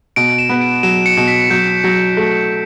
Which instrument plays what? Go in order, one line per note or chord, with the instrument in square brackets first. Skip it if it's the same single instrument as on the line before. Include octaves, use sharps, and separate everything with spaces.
[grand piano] B2 [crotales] D7
[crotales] E7
[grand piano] B3
[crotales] D7
[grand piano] F#3 [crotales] E7
[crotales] C#7
[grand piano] B2
[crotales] B6
[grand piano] F#3 [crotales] G6
[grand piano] F#3
A3